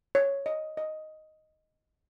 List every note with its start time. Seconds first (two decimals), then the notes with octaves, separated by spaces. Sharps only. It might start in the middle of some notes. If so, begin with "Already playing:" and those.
0.15 C#5
0.46 D#5
0.77 D#5